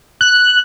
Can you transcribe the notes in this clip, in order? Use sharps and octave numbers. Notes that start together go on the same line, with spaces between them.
F#6